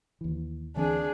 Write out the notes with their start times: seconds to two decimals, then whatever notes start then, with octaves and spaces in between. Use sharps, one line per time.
0.21 D#2 E3
0.76 D2 E3 C4 D4 G#4